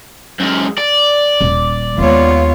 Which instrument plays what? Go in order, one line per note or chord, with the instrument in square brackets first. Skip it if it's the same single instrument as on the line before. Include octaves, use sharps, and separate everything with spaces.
[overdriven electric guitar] F#2 G#3
D5
[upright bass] D#1
[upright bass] D#2 G#3 [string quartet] B3 F4 C#5